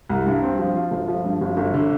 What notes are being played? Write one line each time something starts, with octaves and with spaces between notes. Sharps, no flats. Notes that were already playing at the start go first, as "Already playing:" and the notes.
C2
G2
C4
F3
F4
G1
F3
G2
G1
G1
D3